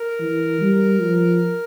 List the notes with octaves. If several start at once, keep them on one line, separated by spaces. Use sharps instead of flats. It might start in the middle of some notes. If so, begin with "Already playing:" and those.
Already playing: A#4
E3
G3
F3